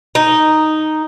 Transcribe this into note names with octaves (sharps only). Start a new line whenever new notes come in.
D#4